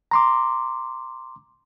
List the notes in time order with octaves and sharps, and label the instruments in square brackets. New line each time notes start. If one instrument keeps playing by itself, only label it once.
[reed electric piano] A#5 C6 D6